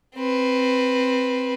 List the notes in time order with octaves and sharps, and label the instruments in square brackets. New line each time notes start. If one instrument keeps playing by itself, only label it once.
[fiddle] C4 B4